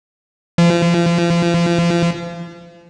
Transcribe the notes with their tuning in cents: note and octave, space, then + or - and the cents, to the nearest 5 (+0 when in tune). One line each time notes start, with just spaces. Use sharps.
F3 -35